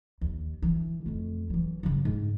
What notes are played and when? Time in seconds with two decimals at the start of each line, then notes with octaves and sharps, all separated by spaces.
0.21 D#2
0.62 E3
1.06 F2 A3
1.50 E3 F#3
1.83 F#2 C#3
2.05 G#2